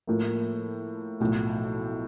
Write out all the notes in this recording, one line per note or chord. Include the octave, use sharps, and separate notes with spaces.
A2 F3 A#3
B1 A2 F3